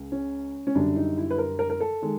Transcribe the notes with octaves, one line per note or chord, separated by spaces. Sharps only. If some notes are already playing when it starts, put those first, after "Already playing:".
Already playing: C#2 C#3 G#3
C#4
C#4
F#2 D3 G3 D4
D#4
E4
B4
A#4
A#4
A#4
A4
D#3 G#3